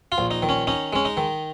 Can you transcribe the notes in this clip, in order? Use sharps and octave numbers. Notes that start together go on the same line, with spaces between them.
F4
A#1
D#4
D#3
C#4
C#4 D#4
G#3 C#4
D#4
D#3